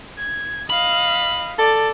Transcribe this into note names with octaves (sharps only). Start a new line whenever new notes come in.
G#6
D#5 F5 B5
A4 D5